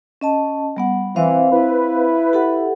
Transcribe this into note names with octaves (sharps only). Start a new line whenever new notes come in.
C#4 D#5 A5
G3 B3 F#5
E3 C4 C5 F5
E4 B4
G4 A4 F#5